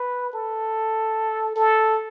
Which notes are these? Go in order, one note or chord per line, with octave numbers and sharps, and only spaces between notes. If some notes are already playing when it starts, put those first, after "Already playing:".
Already playing: B4
A4
A4